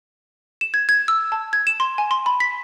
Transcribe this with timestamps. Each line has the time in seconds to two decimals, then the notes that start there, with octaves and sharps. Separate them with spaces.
0.61 E7
0.74 G#6
0.89 G#6
1.08 E6
1.32 A5
1.53 G#6
1.67 E7
1.80 C6
1.98 G#5
2.11 C6
2.26 B5
2.40 B6